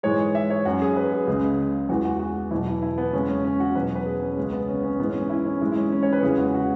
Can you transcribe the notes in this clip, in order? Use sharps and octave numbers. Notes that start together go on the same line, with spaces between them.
G#2 E3 G#3 C#5
E5
C#5
F#2 F#3 F#4
G#4
B4
G#4
C#2 C#3 G#3
E2 E3 G#3 F#4
F#4
F#4
E2 B2 F#3 E4
E4
E4
B3
E2 C#3 G#3 C#4
C#4
C#4
F#4
E2 B2 F#3 B4
B4
G#4
C#4
C#2 C#3 G#3 C#4
B3
C#4
C#4
G#2 E3 G#3 B3
C#4
C#4
E4
C#4
G#2 E3 G#3 E4
E4
C#4
C#4
C#5
B4
E2 C#3 E3 G#3 G#4
F#4
F#4